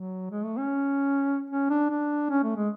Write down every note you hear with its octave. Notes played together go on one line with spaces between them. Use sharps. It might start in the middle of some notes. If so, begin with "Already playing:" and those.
Already playing: F#3
G#3
A3
C#4
C#4
D4
D4
C#4
A3
G#3